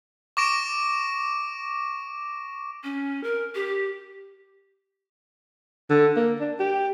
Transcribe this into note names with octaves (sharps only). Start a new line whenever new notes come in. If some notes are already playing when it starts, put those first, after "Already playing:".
C#6 D6 A#6 D7 E7
C#4
A#4
G4
D3
A#3
D4
G4